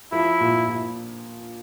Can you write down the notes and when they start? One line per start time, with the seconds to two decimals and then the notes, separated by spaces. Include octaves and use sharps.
0.12 F3 E4
0.40 A#2
0.67 A#2